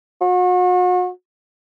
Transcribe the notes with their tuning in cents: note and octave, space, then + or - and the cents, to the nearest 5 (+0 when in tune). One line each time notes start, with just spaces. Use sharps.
F#4 -40